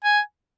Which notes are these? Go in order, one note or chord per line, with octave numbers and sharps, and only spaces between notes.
G#5